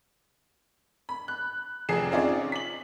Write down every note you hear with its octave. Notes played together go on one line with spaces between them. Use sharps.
B5
F#6
F1 F2 C3 G#4 C7 E7
C4 C#4 D#4 F4 G#4 D5
B6 F#7